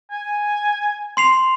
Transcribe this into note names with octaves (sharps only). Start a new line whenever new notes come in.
G#5
C6 C7 F7